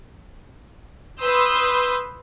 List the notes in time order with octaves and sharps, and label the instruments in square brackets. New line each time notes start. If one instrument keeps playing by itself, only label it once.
[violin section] B4 C6 D#6 E6 G6